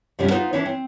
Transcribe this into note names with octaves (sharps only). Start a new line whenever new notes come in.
F#2 C3 F3 G3 C#4
B3 D#4 F4 B4 C5
E3 G#3 C#4 D4 E4 C#5
C4